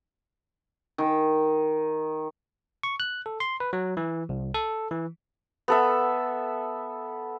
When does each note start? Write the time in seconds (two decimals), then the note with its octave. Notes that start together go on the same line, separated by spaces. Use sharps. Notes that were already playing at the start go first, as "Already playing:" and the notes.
0.98 D#3
2.83 C#6
3.00 F#6
3.26 A4
3.40 C6
3.60 B4
3.73 F#3
3.97 E3
4.29 C2
4.54 A4
4.91 E3
5.68 B3 A4 E5